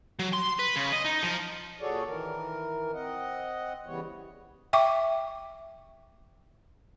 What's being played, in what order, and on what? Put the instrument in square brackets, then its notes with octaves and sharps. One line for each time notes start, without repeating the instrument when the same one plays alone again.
[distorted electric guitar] F#3
C6
B4
C#3
D#5
D#4
F3
[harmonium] A#2 F#4 G#4 A4 C#5 D5
D#3 E3 A#4
C4 D#5 F#5
C#3 E3 G3 B3 C#5
[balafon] E5 G5 C#6 D6